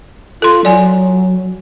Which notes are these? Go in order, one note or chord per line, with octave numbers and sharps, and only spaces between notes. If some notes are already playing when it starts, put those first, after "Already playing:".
F4 A4 C6
F#3 D5 G#5